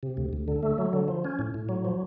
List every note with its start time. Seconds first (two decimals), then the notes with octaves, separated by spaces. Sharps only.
0.03 C3
0.17 D2
0.33 D2
0.48 D3
0.63 A3
0.78 F#3
0.93 D3
1.08 F3
1.24 C#4
1.39 A2
1.54 A2
1.69 F#3
1.85 F3